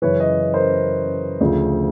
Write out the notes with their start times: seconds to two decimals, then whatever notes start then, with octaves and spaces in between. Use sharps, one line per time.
0.02 F#2 C#3 E3 B4 C#5
0.20 C#5 D#5
0.54 A#4 C5
1.41 D2 C#3 F3